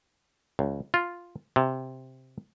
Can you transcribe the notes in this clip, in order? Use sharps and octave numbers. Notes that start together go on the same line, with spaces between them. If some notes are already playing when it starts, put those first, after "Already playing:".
C#2
F4
C3